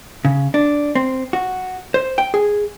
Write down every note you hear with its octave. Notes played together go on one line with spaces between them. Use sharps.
C#3
D4
C4
F#4
C5
G5
G#4